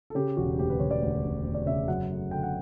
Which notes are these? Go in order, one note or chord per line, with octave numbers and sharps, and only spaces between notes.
A4
C#3 G4
E1 F#4
D2 G4
B4
E1 C#5
D5
D2
E1
D2
D5
C#3 E5
F#2 F#5
A3
D3 G5
F#5